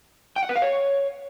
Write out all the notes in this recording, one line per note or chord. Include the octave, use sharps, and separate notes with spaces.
G5
F#5
B4
F5
C#5